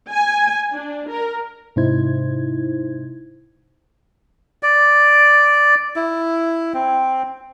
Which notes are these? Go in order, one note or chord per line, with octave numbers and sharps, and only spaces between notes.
G#5
D4
A#4
G#2 C3 D#4 E4 C5 G#6
D5
E4
C4